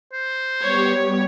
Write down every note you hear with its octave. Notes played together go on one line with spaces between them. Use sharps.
C5
G3 B3 G4 C#5